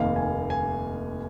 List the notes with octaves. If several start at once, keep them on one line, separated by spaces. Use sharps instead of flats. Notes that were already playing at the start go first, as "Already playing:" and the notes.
Already playing: F1 D#2 D#3 A#3 F5
G#5
G#5